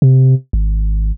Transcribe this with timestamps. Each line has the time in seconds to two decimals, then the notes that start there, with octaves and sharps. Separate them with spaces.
0.02 C3
0.53 G#1